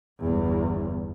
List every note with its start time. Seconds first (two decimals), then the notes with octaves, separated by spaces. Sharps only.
0.19 G1 E2